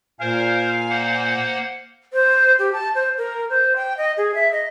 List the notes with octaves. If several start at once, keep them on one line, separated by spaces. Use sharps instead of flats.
A#2 A#4 C5 F5 G#5
A#3 C5 F#5
C5
G4
A5
C5
A#4
C5
G5
D#5
G#4
E5
D#5